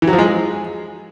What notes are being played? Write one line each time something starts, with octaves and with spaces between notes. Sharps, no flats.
E3
F#3
F3
G#3
G#4